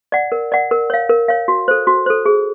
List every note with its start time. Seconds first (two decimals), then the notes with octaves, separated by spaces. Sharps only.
0.12 D5 F#5
0.32 A#4
0.52 D5 F#5
0.71 A#4
0.90 C#5 F5
1.09 A#4
1.28 C#5 F5
1.48 F#4
1.68 A4 C5
1.87 F#4
2.06 A4 C5
2.26 G#4